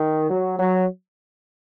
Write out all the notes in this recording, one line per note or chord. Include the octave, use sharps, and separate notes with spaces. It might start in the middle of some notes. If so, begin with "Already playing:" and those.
Already playing: D#3
F#3
F#3